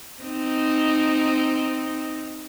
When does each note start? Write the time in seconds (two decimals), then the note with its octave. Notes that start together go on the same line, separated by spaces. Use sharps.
0.23 C4 D#4